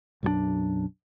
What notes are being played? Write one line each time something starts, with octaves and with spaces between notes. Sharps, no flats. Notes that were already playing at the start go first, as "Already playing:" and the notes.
B1 F#2 F3 D4